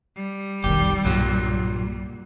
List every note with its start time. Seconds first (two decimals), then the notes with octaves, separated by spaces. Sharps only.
0.17 G3
0.64 F1 B1 D#3 G4
1.05 B1 G2 A#2 F#3